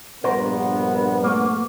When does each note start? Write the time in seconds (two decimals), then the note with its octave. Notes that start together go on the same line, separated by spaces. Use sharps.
0.24 A#1 G2 B3 A#4 C5
1.23 A3 A#3